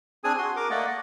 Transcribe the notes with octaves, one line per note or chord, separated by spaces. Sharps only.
C4 D4 G#4 G#5 D#6
F#4 C6
A#4 D6
A3 A#3 D5 D#5 F#5
D#5